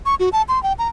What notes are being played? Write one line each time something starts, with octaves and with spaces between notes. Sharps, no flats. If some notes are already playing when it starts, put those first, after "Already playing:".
C#6
F#4
A5
C6
G5
A#5